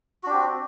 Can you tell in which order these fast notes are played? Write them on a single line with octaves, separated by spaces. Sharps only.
F#4 D4 G4 C4